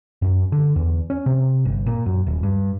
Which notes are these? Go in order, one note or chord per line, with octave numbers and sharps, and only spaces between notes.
F#2
D3
E2
C#4
C3
G1
A#2
F#2
D#1
G2